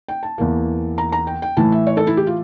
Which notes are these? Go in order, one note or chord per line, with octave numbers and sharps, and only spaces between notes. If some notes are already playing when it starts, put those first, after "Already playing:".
G5
A5
E2 E3 A#3
A#5
A#5
G5
G5
A2 E3 A3 A5
E5
C#5
A4
E4
G4
F4